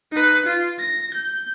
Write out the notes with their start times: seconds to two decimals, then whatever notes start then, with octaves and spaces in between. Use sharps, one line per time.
0.12 D#4 B4
0.46 F4
0.79 A#6
1.14 G6